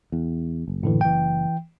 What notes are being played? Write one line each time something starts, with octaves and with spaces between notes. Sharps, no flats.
E2
F#1
A2 D3 E3
E3 G5